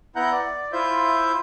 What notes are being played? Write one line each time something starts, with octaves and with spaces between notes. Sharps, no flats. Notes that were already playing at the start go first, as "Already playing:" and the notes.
B3 E4 F#5 A#5 F#6 G6
D5
E4 F4 C5 E5 G6